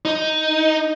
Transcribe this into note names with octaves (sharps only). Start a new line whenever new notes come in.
D#4